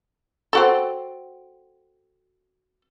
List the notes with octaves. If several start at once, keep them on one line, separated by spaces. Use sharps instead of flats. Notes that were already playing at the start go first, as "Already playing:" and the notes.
C4 F#4 A4